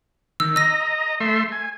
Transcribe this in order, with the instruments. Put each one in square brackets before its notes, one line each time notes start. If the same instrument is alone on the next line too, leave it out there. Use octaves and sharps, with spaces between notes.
[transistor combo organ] D#3 [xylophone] E6
[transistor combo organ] D#5 A#5 [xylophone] E6 A#6
[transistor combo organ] A3 E5 C6
G#5